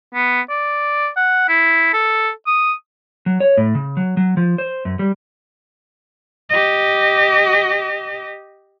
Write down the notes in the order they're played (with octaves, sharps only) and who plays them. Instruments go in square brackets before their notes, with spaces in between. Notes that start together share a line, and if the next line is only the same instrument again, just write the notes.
[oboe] B3
D5
F#5
E4
A4
D#6
[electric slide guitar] F#3
C#5
A2
C#3
F#3
F#3
F3
C5
F#2
G3
[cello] G4 D#5